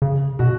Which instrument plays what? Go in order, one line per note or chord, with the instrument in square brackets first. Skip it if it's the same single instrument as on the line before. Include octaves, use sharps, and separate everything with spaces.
[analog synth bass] C#3
[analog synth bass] B2 [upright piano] F#4